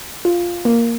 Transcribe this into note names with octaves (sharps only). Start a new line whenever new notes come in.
F4
A#3